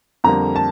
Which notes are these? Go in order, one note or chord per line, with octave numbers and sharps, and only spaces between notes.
F2 D3 G3 A#3 A#5
A5